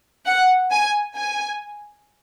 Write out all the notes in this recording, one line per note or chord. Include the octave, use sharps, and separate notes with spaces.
F#5
G#5
G#5